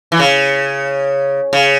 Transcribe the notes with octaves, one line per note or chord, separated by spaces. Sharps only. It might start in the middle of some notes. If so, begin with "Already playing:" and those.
E3
C#3
C#3